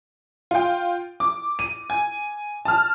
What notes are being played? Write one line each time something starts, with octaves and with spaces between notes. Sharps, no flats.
F4 G5
D6
D#7
G#5
A5 F6